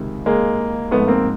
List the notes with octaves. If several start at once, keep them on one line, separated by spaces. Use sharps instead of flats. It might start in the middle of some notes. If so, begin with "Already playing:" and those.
Already playing: C#2 C3 D#3
G#3 A#3
G#2 F3 A3 B3
A#3 C4